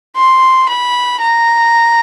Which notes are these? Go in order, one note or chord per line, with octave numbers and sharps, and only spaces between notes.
C6
B5
A#5